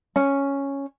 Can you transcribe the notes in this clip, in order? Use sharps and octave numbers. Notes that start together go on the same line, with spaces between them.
C#4